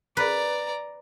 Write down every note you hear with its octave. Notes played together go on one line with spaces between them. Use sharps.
B4 D5 A#5